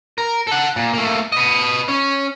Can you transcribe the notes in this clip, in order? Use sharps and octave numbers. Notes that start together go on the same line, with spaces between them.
A#4
A4 F#5
A#2
A3 A#3
B4 D#5
C#4